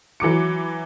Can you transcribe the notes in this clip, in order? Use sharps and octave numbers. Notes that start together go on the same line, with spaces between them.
E3 F#3 D6 C#7